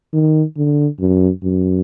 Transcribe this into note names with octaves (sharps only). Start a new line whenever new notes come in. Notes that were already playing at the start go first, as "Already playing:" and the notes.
D#3
D3
F#2
F#2